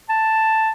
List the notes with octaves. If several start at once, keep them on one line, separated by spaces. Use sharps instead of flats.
A5